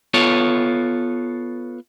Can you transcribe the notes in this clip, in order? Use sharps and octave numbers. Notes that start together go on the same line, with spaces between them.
B3 F4 A4 C#5